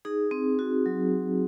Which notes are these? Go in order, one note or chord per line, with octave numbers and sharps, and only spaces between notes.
D#4 G#4
C4
F#4
F#3